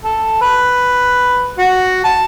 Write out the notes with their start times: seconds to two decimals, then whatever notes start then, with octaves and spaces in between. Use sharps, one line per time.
0.04 A4
0.41 B4
1.58 F#4
2.04 A5